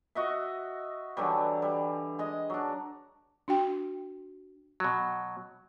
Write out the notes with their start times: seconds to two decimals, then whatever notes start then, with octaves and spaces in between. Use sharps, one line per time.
0.15 F#4 D#5 E5
1.17 D3 E3 F#3 G3
1.62 G3
2.19 G#3 D#5
2.50 F#3 D4
3.48 D4 F#4 G5
4.80 B2 F#3